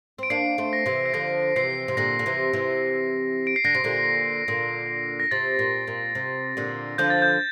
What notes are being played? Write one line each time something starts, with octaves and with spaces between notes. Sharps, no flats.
C4 D7
A#3 D4 C7
A3 C4
A#6
C3 E3
C7
D3 F3 A#6
C3 E3 C7
C3
A#2 D3 A#6
D3
C3 E3
C3 E3
D7
C7
D3 A#6
C3
A#2 D3
A#2 D3
A#6
C3 A6
A#2
A#2
C3
A#2 D3
D3 F3 G6
A6
G6